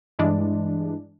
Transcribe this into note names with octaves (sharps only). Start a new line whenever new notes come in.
G2 E3 G#3 D4